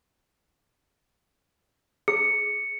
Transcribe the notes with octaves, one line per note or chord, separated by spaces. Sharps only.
G#4 C#7